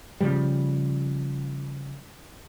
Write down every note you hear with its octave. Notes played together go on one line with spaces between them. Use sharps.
C#3 F3 G3